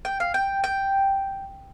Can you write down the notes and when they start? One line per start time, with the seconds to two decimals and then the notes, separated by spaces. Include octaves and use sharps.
0.05 G5
0.20 F5
0.34 G5
0.64 G5